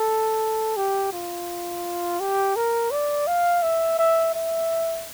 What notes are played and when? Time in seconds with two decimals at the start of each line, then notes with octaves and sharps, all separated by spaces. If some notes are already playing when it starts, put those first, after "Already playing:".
Already playing: A4
0.77 G4
1.13 F4
2.20 G4
2.56 A#4
2.91 D5
3.27 F5
3.63 E5
3.99 E5
4.34 E5